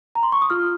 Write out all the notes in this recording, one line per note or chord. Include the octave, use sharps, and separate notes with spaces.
A#5
C6
C#6
D#6
F4 F6